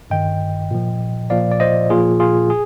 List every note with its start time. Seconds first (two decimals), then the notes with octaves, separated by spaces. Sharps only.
0.10 G2 D#3 D#5 G5
0.71 A#2 F3
1.30 A#2 F3 D5 F5
1.52 D5
1.60 C5 D#5
1.90 A#2 F3 F4 G#4
2.20 F4 G#4
2.50 G#4